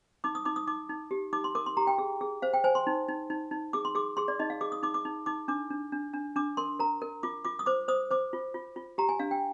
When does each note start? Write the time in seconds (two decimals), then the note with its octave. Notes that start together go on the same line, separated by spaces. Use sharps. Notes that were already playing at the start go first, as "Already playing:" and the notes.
0.24 D#4 D6
0.35 D#6
0.45 D#4 D6
0.56 D#6
0.67 D#4 D6
0.90 D#4
1.11 G4
1.33 D#4 D6
1.44 C6
1.55 A#4 D6
1.66 C6
1.77 G4 A#5
1.87 G5
1.98 G#4
2.21 G#4
2.42 C5 F5
2.53 G5
2.64 C5 G#5
2.75 C6
2.87 D#4
3.08 D#4
3.30 D#4
3.51 D#4
3.73 G#4 D6
3.85 C6
3.95 G#4 D6
4.17 G#4 C6
4.28 D5
4.39 D#4 D#5
4.50 F5
4.61 G#4 D6
4.72 D#6
4.83 D#4 D6
4.94 D6
5.05 D#4
5.26 D#4 D6
5.48 D4 D6
5.70 D4
5.92 D4
6.13 D4
6.36 D4 D6
6.57 A#4 C6
6.80 A#4 A#5
7.02 A#4
7.23 F4 D6
7.45 F4 D6
7.59 D#6
7.66 C5 D6
7.88 C5 D#6
8.11 C5 D6
8.33 F4
8.54 F4
8.76 F4
8.98 G4 A#5
9.09 G#5
9.19 D4 F5
9.31 G5